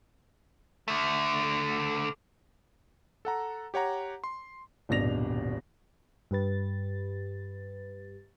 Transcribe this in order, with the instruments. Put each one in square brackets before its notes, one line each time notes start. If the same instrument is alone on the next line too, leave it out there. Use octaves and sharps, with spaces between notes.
[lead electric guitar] D3 A3
[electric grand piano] A4 F#5 A#5
G4 C#5 F#5 A#5
C6
[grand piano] D#1 G#1 B2 D4 A#6 F7
[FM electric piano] G2 G4 B4 A6